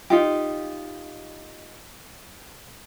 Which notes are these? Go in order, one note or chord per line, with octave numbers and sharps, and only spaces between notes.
D#4 F4 G4